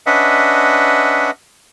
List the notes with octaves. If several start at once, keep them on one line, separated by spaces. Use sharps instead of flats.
C#4 D4 B4 D#5 E5 F#5